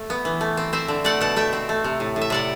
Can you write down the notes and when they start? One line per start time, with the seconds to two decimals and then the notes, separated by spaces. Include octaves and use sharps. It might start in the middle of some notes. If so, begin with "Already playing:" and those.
Already playing: A3
0.10 B3
0.25 E3
0.41 A3
0.57 C4
0.73 C4 C5 E5
0.88 D3
1.04 A3 D5 F#5
1.21 B2 F#5 A5
1.36 A3 E5 G5
1.53 C4
1.69 A3
1.84 C3
2.00 A2
2.16 A2
2.21 E5
2.30 C3 D5 F#5